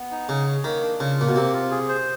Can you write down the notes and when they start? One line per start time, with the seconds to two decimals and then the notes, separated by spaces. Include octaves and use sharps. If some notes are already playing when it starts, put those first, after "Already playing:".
Already playing: B3
0.11 D#4
0.29 C#3 G#4
0.47 C#5
0.64 D#3 A#3
0.82 D4
1.00 C#3 F4
1.18 A#2 A#3
1.29 B2
1.36 C3 C4
1.54 F4
1.71 G#4
1.89 C5